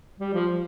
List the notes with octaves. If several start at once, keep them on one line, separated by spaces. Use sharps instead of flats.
G3
F3